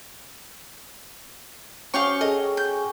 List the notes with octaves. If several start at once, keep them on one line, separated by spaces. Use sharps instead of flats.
C#4 F#4 G4 F5 G5 C#6
G#4 A4 D#5
G6